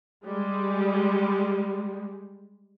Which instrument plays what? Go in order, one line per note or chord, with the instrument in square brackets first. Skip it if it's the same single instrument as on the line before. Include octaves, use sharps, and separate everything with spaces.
[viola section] G3 G#3